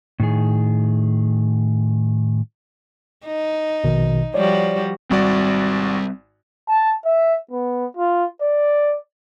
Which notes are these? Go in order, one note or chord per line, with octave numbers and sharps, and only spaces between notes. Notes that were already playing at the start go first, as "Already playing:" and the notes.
A2 D#3 G#4
D#4
A#1 B2 D#3
F3 G3 F#4 C#5 D5
G#1 G3 C4 F#4 D5
A5
E5
B3
F4
D5